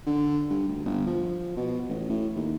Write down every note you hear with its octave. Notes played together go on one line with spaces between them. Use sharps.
D3
G2
D2
G1
F3
B2
A1
A2
D#2